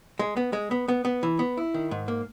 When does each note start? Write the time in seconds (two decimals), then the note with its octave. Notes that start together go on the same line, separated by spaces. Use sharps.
0.19 G#3
0.37 B3
0.53 G#3
0.71 B3
0.88 B3
1.05 B3
1.23 E3
1.39 B3
1.57 E4
1.74 D#3
1.91 G#2
2.08 A#3